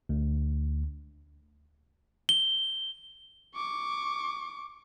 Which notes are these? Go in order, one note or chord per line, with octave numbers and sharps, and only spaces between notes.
D2
G7
C#6 D6